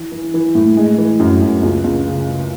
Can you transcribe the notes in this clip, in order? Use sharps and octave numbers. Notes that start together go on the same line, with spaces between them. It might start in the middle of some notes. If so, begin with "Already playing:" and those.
Already playing: E3
E3
E3
A2
G#3
E3
F#2
F#2
C#2
C#2
C#3
C#3